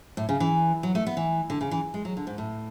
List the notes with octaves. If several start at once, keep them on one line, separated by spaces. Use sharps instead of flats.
A2
C#3
E3
F#3
A3
B3
E3
D3
C#3
E3
G#3
F#3
D3
G#2
A2